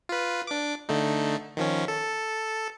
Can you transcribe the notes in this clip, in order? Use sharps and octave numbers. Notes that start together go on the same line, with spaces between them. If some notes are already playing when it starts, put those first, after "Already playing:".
F4 B4
D4 D6
D3 A3 D#4
D#3 F3 C#4
A4